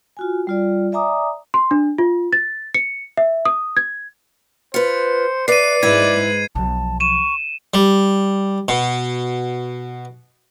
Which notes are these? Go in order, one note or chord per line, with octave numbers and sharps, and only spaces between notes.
F4 F#4 G#5
G3 F4 D5
D5 E5 G#5 A#5 D6 D#6
C6
D4
F4
A6
C#7
E5
D#6
G#6
F4 B4 C5 C#7
B4 D5 E5 C7 D#7
G#2 G#3 E4 B4 E5 G#6
B1 F3 A5
C#6 D#7 E7
G3
B2